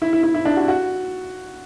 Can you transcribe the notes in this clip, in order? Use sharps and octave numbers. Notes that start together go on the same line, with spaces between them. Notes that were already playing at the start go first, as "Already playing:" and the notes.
E4
E4
E4
E4
D4
F#4
F#4